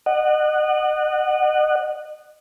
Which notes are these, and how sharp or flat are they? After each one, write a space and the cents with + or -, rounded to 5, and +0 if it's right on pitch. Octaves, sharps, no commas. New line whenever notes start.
D#5 -35 F#5 +0